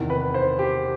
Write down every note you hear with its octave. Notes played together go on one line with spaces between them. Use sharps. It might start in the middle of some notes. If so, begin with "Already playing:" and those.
Already playing: E2 C3 D#3
B4
C5
G4